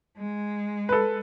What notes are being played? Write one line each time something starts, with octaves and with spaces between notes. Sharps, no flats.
G#3
A4 B4